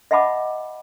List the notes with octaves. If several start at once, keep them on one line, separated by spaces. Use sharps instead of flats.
D#5 E5 F#5 A5 B5 D6